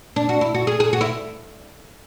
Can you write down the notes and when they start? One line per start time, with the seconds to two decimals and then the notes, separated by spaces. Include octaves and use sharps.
0.16 D4
0.29 F#4
0.41 E4
0.55 F#4
0.67 G#4
0.80 G#4
0.93 F#4
1.01 E4